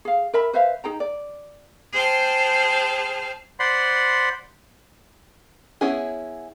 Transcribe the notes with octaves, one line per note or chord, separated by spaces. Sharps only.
G#4 F5
A#4 E5 B5
B4 C5 E5 F5
D#4 G#4 G5 A#5
D5
G#4 C5 G5 A5 F6
C5 D5 F#5 B5 C6
B3 C#4 E4 G#4